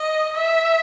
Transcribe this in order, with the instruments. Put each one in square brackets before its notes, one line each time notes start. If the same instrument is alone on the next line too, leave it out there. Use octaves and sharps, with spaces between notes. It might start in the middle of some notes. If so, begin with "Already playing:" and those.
Already playing: [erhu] D#5
E5